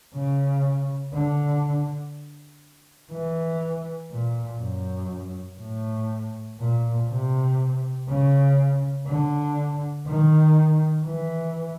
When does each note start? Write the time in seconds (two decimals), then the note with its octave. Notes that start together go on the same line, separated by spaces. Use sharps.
0.14 C#3
1.13 D3
3.12 E3
4.11 A#2
4.60 F#2
5.60 A2
6.59 A#2
7.08 C3
8.08 C#3
9.07 D3
10.06 D#3
11.05 E3